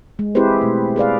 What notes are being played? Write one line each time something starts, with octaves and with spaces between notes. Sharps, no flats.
G#3
C4 E4 G4 G#4 B4 C5
B2 A3
G#4 B4 D5 F5